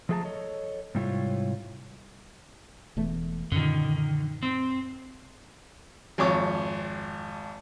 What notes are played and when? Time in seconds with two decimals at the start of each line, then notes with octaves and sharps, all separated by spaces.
0.09 F3 A3 G#4 D#5 A5 A#5
0.25 A4 C#5 D#5
0.95 G#2 C3 G3 E4 F4 C#5
2.97 E1 E2 A3
3.52 F#2 A#2 D3 D#3
4.43 C4
6.18 G#1 F2 C#5 D6